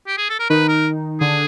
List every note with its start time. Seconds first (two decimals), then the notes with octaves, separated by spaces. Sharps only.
0.07 G4
0.18 G#4
0.29 A4
0.39 A#4
0.50 D#3 D#4 B4
0.68 A#4
1.20 D3 D4 G#4